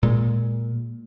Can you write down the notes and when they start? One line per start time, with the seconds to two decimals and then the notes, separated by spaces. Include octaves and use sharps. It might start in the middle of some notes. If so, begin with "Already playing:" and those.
0.03 A#2 G#3